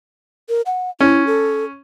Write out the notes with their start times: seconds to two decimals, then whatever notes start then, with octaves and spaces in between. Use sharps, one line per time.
0.49 A#4
0.66 F#5
1.01 C#4 E4
1.27 A4